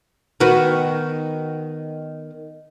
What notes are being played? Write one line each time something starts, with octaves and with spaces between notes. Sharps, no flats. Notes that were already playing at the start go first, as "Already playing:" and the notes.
D#3 B3 F#4